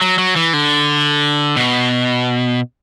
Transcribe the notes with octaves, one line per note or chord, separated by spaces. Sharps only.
F#3
F#3
E3
D3
B2